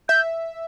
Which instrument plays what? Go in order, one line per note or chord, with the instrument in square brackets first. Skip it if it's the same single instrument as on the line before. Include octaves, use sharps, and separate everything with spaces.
[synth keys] E5 [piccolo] G6